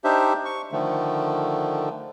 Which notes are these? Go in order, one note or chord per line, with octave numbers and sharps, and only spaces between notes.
D4 D#4 G4 C5 E5
C#6
D3 D#3 F3 A3